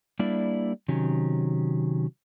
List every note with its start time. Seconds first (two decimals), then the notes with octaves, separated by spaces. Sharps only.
0.19 G3 A#3 D4 E4 D5
0.88 C3 D#3 F#3 C#4